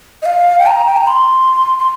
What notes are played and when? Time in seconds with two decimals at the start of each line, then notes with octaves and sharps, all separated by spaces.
0.22 D#5
0.26 F5
0.59 G5
0.67 A#5
0.86 G5
0.97 A#5
1.07 C6
1.79 C6